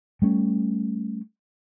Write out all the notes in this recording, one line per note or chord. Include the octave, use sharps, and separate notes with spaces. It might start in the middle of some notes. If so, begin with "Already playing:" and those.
G3 A3 C#4